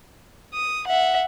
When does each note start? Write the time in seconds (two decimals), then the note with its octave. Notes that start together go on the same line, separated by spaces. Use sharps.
0.54 D#6
0.87 E5 F#5